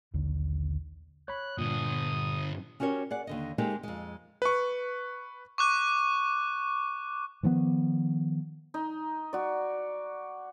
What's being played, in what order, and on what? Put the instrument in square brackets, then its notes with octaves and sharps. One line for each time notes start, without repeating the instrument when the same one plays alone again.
[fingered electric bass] A#1 D#2 D3
[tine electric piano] C#5 B5 [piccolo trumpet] F#6
[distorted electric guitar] G2 D3 [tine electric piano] A#2 [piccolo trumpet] D#6
[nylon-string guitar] C#4 F#4 G4 A#4 C#5
G#4 D5 F#5
D#2 D3 D#5
G#3 A#3 C4 D#4 G4 A4
F2 G#3
[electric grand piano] B4 C#6
[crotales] C#6 D6 F#6
[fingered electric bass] D#3 F3 G#3 B3
[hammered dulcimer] D#4
F#4 D5